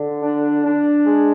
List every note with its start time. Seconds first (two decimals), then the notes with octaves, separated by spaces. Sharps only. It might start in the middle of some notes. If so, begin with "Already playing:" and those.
Already playing: D3
0.22 D4
0.64 D4
1.05 G#3